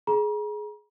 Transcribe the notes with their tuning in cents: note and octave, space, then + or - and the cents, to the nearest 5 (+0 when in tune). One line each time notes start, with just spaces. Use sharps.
G#4 +20 A#5 +40